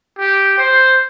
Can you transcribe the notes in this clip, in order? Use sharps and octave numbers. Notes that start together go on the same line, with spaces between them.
G4
C5